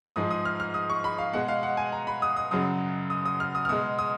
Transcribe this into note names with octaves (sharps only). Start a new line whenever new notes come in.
G#2 F3 G#3 D#6
D#6
F6
F6
D#6
C#6
B5
F5
B2 G#3 F#5
F5
F#5
G#5
A#5
B5
D#6
D#6
F#2 C#3 F#3 D#6
D#6
D#6
F6
D#6
F6
B2 G#3 D#6
D#6